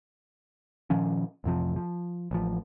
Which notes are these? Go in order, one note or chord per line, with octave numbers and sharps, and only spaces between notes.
A#2 D#3 F3 C#4
A1 F2 C3 F3
F3
A1 F3